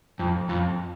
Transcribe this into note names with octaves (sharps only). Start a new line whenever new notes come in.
F2
F2